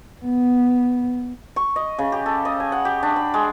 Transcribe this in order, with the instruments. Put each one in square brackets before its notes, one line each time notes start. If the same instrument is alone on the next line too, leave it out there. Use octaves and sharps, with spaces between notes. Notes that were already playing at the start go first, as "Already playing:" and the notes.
[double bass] B3
[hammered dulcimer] C#6
D#5
C#3
G4
A4
D#5
G#5
F#5
G4
D4
B5
G#3